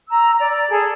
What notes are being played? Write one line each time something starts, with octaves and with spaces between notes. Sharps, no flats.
A#5 E6
D5
G#4 A4